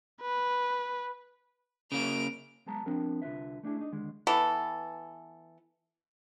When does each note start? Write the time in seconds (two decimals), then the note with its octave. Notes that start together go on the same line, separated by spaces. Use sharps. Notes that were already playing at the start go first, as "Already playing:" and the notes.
0.22 B4
1.92 C#3 A#3 D7 F7
2.66 F#3 G#3 B3 A5 A#5
2.86 F3 B3 C4 D4 A#4
3.22 C2 D3 F4 B4 E5
3.63 A3 D4 E4 G#4
3.80 D4 D#4
3.92 D#2 D3 G#3
4.27 E3 B3 A4